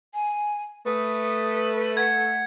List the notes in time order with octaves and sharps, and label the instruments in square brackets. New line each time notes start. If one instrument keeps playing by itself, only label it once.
[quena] G#5
[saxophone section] A3 [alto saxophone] B4 [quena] D#6
[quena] F#5 [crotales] G#6